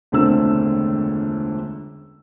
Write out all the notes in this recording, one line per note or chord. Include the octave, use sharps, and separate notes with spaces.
E1 C#2 D3 A3 C4 E6